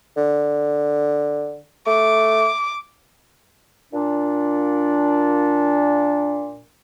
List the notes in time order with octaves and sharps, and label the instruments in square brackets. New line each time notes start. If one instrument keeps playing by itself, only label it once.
[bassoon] D3
[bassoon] A3 [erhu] D6
[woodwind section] A#2 D4